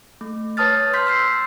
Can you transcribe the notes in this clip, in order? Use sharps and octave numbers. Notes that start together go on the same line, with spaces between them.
A3
B4 C#5 A5 D#6 F6 A6
C6 F6 G6 B6
C6 E6 G6 C7